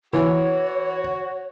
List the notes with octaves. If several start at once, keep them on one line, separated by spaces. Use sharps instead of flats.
E3 F#4 C#5